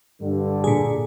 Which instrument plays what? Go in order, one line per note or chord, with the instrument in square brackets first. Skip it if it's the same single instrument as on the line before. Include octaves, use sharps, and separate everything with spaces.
[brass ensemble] G2 D3
[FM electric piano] A#2 G#4